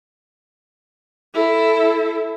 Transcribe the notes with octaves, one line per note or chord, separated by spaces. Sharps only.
E4 A4